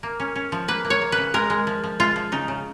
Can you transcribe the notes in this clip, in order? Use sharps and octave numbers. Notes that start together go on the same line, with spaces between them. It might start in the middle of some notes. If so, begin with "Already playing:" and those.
A#3
C#4
C#4
F3
A#3 B4
A#3
C#5
A#3
B4
C#3
G#3 A#4
G#3
F3
F3
G#3 F4
F3
C#3 D#4
C#3